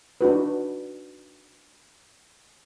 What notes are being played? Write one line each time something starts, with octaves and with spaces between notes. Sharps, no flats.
D4 D#4 F#4 B4